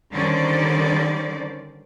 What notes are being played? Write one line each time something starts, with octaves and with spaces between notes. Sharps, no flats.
D3 D#3 G3 C#4 C5 D5